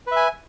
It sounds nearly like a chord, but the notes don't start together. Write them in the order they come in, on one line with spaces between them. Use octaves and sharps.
B4 E5 G#5